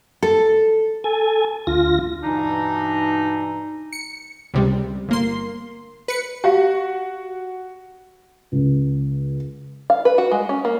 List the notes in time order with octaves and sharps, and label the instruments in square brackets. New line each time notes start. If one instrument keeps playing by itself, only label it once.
[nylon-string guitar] A4
[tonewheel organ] A4 G#5
D2 F4 A#6
[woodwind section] G2 B2 E3 D4 D#4
[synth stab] C#7
C#2 C3 G3
G1 A#3 C6
B4 C#7
[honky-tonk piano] F#4 [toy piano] G4 F5
[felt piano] C#2
[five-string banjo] F5
B4
F#4
G#3
C#4
A#3